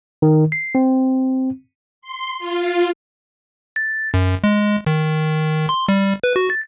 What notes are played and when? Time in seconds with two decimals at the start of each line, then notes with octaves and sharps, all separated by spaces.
0.22 D#3
0.52 C7
0.75 C4
2.02 C6
2.39 F4
3.76 A6
4.14 F#2
4.44 G#3
4.86 D#3
5.69 C6
5.88 G3
6.24 B4
6.36 F#4
6.50 A6